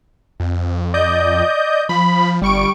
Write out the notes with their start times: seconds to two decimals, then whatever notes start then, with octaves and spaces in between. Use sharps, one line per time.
0.40 F2
0.94 D5 D#5 G6
1.89 F3 B5
2.42 G1 G3 C#6 D7